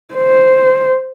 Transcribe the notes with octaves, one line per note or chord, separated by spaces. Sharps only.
C5